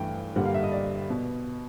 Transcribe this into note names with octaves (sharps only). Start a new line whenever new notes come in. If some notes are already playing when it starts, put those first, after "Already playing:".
Already playing: G2 E3 A3 G5
G2 D3 G3 A#3 F#5
F5
E5
D#5
D5
B2